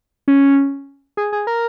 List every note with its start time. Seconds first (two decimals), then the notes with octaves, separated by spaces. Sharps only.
0.28 C#4
1.17 G#4
1.33 G#4
1.47 A#4